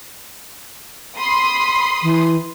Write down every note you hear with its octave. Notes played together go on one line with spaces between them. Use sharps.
B5 C6 D#6
E3